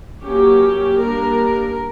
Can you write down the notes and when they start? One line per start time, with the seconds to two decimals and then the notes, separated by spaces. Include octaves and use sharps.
0.23 F#3 A#3 C#4 G4
0.97 G3 A#3 D4 A#4